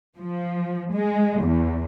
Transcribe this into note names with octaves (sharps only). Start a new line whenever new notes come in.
F3
G#3
E2